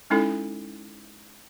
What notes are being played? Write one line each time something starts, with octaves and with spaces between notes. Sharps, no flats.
G#3 C#4 D#4 E4 A4